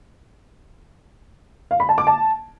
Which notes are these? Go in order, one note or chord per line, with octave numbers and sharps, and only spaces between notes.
F5
B5
A5
D6
A5